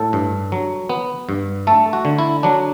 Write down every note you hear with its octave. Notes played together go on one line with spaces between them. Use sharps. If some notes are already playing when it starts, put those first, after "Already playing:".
Already playing: A2 A4
G2
F#3
B3
G2
A3 A4
F#4
D3
E4
F#3 D4